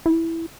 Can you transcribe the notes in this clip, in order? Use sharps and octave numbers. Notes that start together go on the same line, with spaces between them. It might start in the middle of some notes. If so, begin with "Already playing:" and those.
E4